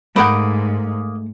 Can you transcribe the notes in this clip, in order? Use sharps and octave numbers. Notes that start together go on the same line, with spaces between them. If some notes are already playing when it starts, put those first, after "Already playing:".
G#2 A3 A#3 A#4 D#5 F#5 B5 G6